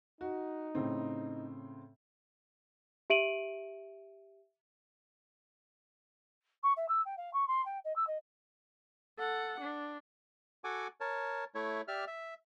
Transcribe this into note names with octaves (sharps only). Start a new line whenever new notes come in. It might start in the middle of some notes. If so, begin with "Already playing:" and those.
D#4 F#4
A2 C#3 C4
G4 E5 D7 D#7 F#7
C#6
E5
E6
G5
F5
C#6
C6
G5
D#5
E6
D#5
A4 F#5
D4
F#4 A4 F#5 G#5 D6
A#4 C#5 A5
A3 E4 C#5
G4 D5 E5 F6
E5